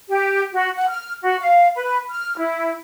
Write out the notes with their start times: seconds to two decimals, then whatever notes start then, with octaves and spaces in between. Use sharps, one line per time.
0.09 G4
0.54 F#4
0.75 F#5
0.88 F6
1.22 F#4
1.40 F5
1.75 B4
2.10 F6
2.38 E4